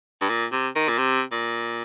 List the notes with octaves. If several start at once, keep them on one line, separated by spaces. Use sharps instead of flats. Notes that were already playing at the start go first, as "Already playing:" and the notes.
G2
A#2
C3
D#3
A#2
C3
A#2